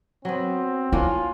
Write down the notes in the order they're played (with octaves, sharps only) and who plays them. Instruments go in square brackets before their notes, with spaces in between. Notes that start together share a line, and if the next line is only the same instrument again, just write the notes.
[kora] F#3 B3 [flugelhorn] C4
[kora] A#3 C#4 D4 [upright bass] E4 [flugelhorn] F4